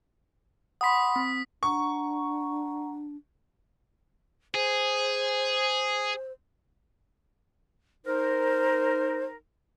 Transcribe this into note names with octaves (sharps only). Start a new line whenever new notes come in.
F#5 B5 C6 D#6 B6
C4
D4 F#5 A#5 C#6
G#4 C5
D#4 A#4 C5